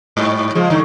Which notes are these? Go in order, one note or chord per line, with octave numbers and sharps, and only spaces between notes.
G#2 G3
C#3 F3 G#3
G2 D3 E3